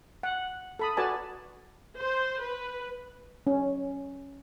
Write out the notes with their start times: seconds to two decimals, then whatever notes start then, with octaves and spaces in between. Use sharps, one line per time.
0.23 F#5
0.79 A4 B5 D#6
0.97 F#4 A4 B4 D5 G#5 A5
1.98 C5
2.40 B4
3.47 C#4